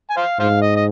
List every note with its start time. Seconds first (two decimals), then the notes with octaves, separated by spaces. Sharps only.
0.10 G#5
0.17 C5 F5
0.40 G#2 C5 F5
0.61 D#5
0.76 D#5